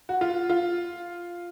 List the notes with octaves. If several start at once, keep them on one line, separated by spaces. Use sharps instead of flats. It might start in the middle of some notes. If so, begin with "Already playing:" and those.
F#4
F4
F4